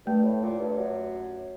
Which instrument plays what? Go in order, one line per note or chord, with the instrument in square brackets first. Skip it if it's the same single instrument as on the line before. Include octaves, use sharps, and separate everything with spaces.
[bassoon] G2 [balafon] A3
[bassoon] A2
A#2
G2
F#2